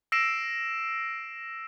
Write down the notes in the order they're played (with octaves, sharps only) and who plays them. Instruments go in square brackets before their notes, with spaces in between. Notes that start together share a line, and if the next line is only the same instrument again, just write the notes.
[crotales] E6 A#6 C7 D7 E7